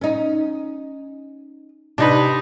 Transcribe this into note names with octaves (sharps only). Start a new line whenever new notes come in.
C#4 D#4
C3 D4 D#4 B4